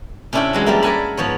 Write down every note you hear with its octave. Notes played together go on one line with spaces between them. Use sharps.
C3 C#4 D4 E4 C#5 G5
E3 F#3 G#3
F3 G3 A#3 E4
A#4 D5 F#5 G#5 A5 B5
G#2 F3 B3 C#5